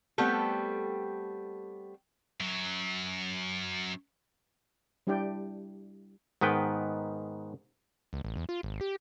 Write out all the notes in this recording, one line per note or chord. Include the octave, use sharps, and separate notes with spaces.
G3 A3 B3 C4 G4 A4
F#2 F#3
G3 D4 E4 G4 D5 G5
G#2 D#3 B3 B4 G5
C#2
A1
E2
F4
G#1
G4